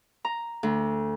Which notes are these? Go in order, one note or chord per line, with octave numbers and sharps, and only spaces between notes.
A#5
D2